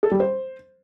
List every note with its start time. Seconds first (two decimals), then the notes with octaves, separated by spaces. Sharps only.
0.03 A4
0.11 G3
0.20 C5